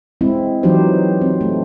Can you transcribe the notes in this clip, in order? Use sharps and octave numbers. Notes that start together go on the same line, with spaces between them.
G#3 C4 E4
E3 F#3 D#4 F4 G4 C5
C4
A3